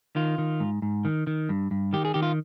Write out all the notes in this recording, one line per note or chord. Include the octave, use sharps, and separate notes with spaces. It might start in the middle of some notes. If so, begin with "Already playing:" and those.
D#3 F4
D#3
G#2
G#2
D#3
D#3
G2
G2
D#3 G4
G#4
D#3 G4
F4